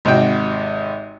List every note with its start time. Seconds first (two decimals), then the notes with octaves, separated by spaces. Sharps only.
0.05 G#1 C3 F#4 G5